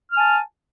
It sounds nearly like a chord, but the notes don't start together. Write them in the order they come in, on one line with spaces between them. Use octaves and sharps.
F6 G#5 A5